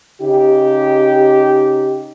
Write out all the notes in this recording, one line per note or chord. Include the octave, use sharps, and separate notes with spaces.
C#3 D#4 G4